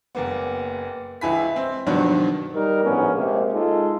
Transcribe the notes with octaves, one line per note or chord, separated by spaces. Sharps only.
F#1 A#3 B3
C#2 E3 E4 G#5 B5 B6
C4
G2 B2 D#3 F3 F#3 D4
G3 D#4 A#4
A#1 A2 B3 C#4
C3 G#3 A#3
G#3 D#4 F4 A4